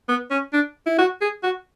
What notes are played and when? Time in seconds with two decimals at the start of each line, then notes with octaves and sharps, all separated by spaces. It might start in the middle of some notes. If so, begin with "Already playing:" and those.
0.09 B3
0.31 C#4
0.53 D4
0.87 E4
0.98 F#4
1.21 G#4
1.43 F#4